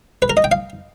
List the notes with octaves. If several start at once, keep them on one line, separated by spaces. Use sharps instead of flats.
B4
A#4
D#5
G5
F5